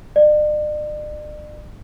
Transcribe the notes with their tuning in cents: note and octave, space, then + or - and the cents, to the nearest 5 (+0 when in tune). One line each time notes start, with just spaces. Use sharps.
D5 +40